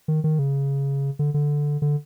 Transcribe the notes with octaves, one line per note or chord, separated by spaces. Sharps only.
D#3
D#3
C#3
D3
D3
D3